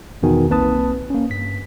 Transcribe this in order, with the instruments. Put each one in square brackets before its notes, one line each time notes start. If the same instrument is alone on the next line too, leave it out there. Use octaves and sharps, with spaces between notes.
[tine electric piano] E2 B2 D#3 F#4 G#5
B1 A#3 C4 B4 A5 D#6
A#3 C#4
G2 B6